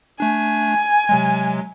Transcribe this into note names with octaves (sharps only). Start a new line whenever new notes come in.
A3 D4 G#5
C3 F#3 G#3